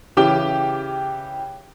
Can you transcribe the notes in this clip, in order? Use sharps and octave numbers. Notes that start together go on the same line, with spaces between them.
C#3 E3 G4 D6 G7